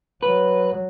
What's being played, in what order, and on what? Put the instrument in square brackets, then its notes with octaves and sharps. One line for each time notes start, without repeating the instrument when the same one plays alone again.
[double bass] F#3 [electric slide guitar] B4